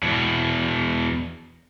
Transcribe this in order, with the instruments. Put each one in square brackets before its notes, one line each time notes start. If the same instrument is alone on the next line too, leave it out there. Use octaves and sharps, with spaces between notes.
[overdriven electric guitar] E2 B2